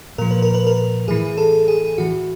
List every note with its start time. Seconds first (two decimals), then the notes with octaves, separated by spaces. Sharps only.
0.18 A#2 F3 A#4
0.31 B4
0.42 A#4
0.54 B4
0.67 A#4
1.08 A2 E3 G#4
1.37 A4
1.68 G#4
1.98 A2 E3 F#4